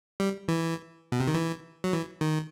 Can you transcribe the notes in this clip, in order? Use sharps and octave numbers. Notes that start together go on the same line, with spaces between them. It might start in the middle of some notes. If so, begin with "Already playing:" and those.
G3
E3
B2
C3
D#3
E3
F#3
E3
D#3